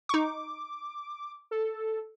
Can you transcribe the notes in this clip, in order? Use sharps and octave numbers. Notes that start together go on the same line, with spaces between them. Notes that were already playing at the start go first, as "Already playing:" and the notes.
D#4 C#6 D6
A4